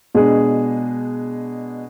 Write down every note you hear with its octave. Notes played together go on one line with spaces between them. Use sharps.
B2 G#3 D4 G#4